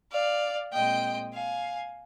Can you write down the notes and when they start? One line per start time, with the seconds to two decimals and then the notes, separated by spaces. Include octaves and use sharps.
0.12 D5 F5
0.73 A#2 G#3 C4 D#5 G5
1.34 F5 G#5